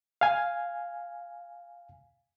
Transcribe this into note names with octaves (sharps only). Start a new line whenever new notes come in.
F5 G#5